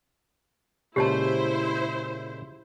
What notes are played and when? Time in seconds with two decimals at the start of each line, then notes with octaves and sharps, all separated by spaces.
0.96 A#2 C#3 G#3 E4 G4 C5 C#5 A5